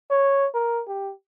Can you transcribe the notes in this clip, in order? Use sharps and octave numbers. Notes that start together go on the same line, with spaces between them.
C#5
A#4
G4